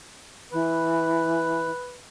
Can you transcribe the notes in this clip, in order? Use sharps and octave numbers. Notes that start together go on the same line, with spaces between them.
E3 B4